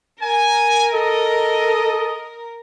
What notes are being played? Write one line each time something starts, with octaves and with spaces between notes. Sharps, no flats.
A#4 G#5
A4 D#5